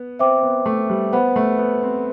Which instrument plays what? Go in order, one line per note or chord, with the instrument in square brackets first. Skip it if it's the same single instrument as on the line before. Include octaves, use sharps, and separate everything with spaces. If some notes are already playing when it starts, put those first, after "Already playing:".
Already playing: [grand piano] B3
[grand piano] C4 [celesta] C5 E5 G5 D6
[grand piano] B3
A3
G3
[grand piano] B3 [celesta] C5 F#5 B5
[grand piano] A3
B3
C4